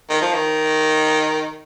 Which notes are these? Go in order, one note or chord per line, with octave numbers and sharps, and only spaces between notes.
D#3
F3
D#3